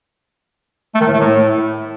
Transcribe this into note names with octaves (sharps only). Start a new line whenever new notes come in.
A3
D#3
A2
A3
A2